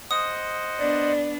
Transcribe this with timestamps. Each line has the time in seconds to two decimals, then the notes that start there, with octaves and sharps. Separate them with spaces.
0.11 C5 D#5 F#5 D#6
0.79 B3 D4 D5